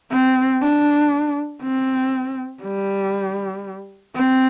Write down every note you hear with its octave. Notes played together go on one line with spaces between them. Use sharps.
C4
D4
C4
G3
C4